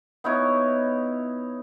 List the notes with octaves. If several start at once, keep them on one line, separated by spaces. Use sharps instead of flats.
B3 D#4 E4 C#5